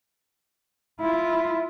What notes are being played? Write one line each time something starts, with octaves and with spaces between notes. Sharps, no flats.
E4 F4